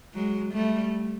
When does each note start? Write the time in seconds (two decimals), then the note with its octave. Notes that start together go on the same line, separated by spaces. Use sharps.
0.14 F#3 G#3
0.53 G3 A3